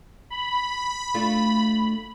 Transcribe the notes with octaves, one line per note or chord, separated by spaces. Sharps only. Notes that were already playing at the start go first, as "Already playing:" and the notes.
B5
A3 D4 F4